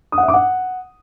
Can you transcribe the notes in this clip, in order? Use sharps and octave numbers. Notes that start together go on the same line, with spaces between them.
D#6
F#5
E5
D6
F#5